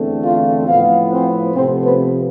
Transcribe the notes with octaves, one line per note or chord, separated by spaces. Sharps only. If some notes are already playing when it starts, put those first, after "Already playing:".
Already playing: E2 D3 A3 C4
F4 F5
A2 F3 B3 F4 F5
C4 C5
C3 F3 A3 C4 C5
B3 B4